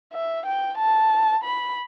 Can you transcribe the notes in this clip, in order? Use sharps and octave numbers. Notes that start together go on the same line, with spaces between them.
E5
G5
A5
B5